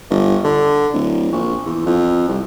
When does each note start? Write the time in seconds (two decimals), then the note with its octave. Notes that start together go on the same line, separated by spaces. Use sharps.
0.10 G1
0.44 D3
0.93 D1
1.32 A#1
1.66 E2
1.86 F2
2.28 C2